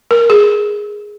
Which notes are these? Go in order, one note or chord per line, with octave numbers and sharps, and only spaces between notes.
A#4
G#4